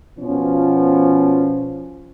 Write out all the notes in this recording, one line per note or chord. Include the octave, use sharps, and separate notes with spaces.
B2 F3 C#4